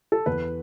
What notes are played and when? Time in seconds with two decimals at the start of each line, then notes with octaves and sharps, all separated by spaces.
0.12 A4
0.26 E2 B4